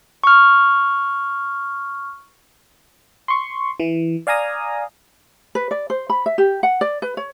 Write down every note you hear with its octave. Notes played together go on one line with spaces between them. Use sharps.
C#6 F6
C6 C#6
E3
D5 F5 G#5 A#5 D#6
B4
D5
C5
B5
E5
G4
F#5
D5
B4
C#5